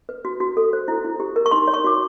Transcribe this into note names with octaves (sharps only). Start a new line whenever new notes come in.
B4
F#4
F#4
A4
C5
E4
E4
G4
A#4
C#6
D#4 C6
C#5
C#6
F#4 D6